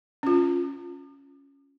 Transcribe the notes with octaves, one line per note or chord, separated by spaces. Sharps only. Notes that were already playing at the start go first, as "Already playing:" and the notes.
C#4 F4